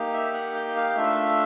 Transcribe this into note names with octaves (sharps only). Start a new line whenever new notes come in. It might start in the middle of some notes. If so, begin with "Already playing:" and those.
Already playing: A#3 D#4 G4
E5
F#5
G5
F5
A3 D4 F4 A4 E5